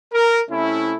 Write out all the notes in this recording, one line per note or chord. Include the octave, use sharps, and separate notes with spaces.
A#4
C3 A3 C#4 E4